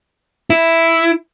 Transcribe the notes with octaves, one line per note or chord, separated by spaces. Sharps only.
E4